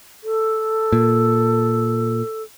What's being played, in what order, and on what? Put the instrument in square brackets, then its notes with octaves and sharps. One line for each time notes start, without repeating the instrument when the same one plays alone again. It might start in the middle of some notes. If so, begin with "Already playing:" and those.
[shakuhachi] A4
[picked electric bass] A#2